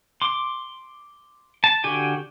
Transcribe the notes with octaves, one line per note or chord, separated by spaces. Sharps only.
C6 D6
A5
D3 F#4 G4 G#5